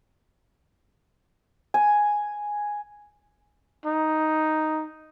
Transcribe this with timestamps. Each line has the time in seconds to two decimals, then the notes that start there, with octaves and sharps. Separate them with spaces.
1.74 G#5
3.86 D#4